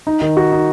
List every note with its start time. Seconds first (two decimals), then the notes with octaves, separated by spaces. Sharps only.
0.07 D#4
0.22 D#3
0.37 F#4
0.52 D#4